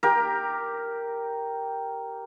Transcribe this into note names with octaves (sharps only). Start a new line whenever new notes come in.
G4 A#4